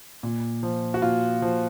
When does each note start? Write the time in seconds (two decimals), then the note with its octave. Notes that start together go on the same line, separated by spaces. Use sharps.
0.23 A#2
0.63 F3
0.94 F#4
1.02 A#2 F4
1.42 F3